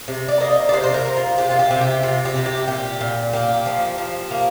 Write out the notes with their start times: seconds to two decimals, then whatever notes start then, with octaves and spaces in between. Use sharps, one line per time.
0.08 C3
0.28 D5
0.40 A#3 D#5
0.69 D5
0.73 C3 C5
0.84 C5
0.94 A#4
1.06 A#3
1.17 F4
1.38 C3 G4
1.50 F4
1.59 G4
1.71 C3
1.81 G4
2.03 C3 F4
2.25 G4
2.36 C3
2.46 G4
2.68 A#2 G4
3.01 A#2
3.33 A#3 G4
3.66 F3
3.98 F3
4.31 A#3